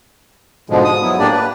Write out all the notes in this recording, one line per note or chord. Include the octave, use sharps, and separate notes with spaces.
G#2 B2 D3 F3 G#3
D#6
F#3 B3 E4
A2 A#3 D4 G4 D5
B4